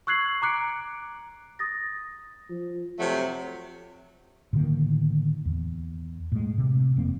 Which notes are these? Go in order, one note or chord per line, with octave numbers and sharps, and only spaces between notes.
C#6 E6 F#6 G#6 C7 F#7
A#5 D6 F#6 C#7 D7
D#6 A6 A#6
F3
F2 C3 F#3 A3
A2 D3 D#3 A#3
E2
A2 G#3
C3
E1 F2 A#3 C4